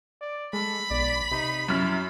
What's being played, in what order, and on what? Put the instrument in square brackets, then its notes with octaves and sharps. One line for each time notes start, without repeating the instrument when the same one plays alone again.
[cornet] D5
[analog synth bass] G#3 [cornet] A4 [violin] B5
[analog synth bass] B1 [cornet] D5
[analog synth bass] C3 [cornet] D#4
[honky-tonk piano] F#2 F6 [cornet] E4